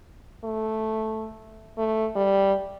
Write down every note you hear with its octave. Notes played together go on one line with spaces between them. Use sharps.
A3
A3
G3